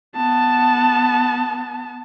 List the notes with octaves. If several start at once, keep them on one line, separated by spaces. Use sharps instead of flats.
B3 A5